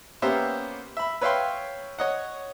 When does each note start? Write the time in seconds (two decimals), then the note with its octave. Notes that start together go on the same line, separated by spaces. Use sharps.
0.22 A#3 B3 C#4 G4 C5 E5
0.97 E5 B5
1.21 B4 C#5 E5 F5 G5 C6
1.99 C#5 D#5 F#5